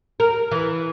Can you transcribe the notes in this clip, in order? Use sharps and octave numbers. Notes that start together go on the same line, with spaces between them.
A#4
E3